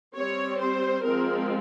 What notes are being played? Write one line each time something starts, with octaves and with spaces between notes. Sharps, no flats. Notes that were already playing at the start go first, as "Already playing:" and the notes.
G3 C4 C#5
C5
F3 G#3 C4 A#4